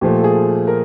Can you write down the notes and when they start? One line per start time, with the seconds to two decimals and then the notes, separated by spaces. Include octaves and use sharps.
0.01 A#2 F3 A3 G4
0.19 A4
0.24 G#4
0.67 A#4